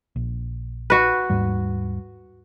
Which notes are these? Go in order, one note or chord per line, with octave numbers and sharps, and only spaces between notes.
A#1
F#4 B4
D#2 G#2 G3